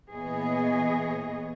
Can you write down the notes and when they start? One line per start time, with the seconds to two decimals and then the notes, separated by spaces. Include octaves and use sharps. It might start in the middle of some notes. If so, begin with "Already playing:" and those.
0.11 A#2 E3 B3 G#4 C#5 D#5